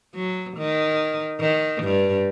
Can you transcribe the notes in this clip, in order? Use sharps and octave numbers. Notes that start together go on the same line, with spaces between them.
F#3
D#3
D#3
G2